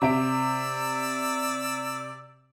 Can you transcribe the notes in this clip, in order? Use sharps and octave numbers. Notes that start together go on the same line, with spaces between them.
C3 D5 E5 E6 D7